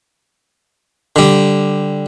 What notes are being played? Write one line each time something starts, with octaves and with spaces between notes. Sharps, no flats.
D3 G3